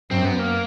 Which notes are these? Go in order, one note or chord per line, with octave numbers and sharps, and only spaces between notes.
F#2 C4
B3
A#3